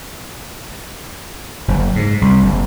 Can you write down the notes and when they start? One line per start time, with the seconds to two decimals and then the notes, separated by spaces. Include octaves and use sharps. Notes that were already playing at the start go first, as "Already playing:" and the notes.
1.68 F#1
1.96 G#2
2.21 C2
2.43 F#1